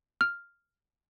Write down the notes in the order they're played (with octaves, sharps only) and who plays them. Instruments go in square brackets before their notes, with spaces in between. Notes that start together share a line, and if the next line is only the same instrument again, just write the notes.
[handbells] F6